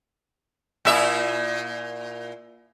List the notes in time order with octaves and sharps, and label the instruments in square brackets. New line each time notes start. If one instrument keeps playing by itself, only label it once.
[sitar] A#2 E4 E5